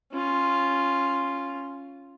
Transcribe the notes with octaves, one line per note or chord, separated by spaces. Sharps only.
C#4 F4